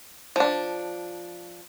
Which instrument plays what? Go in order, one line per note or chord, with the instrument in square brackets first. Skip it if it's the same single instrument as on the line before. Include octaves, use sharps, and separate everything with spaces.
[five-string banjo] F3 D4